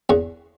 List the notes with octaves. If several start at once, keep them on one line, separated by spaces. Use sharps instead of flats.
E2 C#6